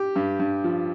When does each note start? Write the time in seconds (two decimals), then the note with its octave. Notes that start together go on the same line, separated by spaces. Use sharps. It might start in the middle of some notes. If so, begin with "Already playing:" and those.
Already playing: G4
0.16 G2
0.39 G2
0.64 F3